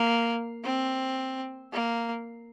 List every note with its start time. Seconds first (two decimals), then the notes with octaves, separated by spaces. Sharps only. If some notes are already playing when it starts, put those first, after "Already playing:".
Already playing: A#3
0.64 C4
1.73 A#3